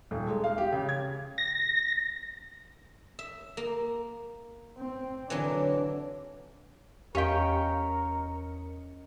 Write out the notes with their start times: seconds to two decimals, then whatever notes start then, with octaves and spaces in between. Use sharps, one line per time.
0.11 D#1
0.28 G#3
0.44 F5
0.58 G4
0.72 C#3
0.89 G#6
1.38 A#6
3.19 E5
3.57 A#3
4.78 C4
5.30 D3 E3 F#3 D4
7.15 E2 C#4 G4 A#4 D#5 F5 G5 C#7